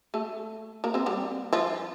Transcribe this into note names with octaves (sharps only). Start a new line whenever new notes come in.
A3 A4
A#3 A#4
C4 C5
G3 G4
F3 F4